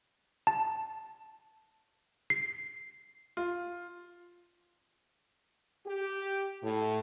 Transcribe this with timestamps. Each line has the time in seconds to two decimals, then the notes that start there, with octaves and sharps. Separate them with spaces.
0.47 A5
2.30 C7
3.37 F4
5.87 G4
6.63 A2